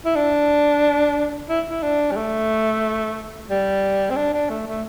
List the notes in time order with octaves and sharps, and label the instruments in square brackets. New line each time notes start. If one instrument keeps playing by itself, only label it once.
[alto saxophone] E4
D4
E4
E4
D4
G3
A3
G3
C4
D4
D4
A3
A3